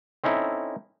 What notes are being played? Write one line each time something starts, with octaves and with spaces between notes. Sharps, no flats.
C4 C#4 D#4 E4 A4